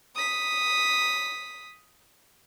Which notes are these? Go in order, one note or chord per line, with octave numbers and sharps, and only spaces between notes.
D#6 B6